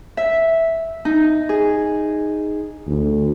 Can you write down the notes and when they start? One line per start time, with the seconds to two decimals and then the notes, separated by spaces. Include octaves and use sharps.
0.17 E5
1.05 D#4
1.49 G#4
2.87 D2